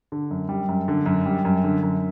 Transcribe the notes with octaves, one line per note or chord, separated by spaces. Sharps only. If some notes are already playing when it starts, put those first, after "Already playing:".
D3
F#2
G3
F#2
D3
F#2
G3
F#2
D3
F#2